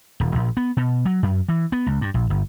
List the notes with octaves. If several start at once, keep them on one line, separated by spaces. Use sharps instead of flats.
D#1
A#1
B3
B2
F#3
F#2
E3
B3
C#2
G2
A#1
G1